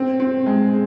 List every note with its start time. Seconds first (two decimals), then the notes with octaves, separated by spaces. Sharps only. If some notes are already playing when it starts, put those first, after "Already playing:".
Already playing: C4
0.20 C4
0.46 G#3